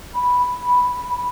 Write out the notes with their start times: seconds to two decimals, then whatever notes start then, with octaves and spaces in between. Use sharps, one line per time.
0.15 B5